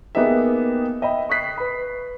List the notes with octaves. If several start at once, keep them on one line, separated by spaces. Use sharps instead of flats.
A#3 B3 D#4 G4 G#4 E5
D#5 E5 G5 B5
C#6 D#6 F#6 B6 C7
B4 B5